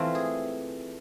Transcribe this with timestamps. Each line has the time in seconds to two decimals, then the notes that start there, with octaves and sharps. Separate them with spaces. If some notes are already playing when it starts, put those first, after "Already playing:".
Already playing: E3 A3 C4 F4
0.15 G#4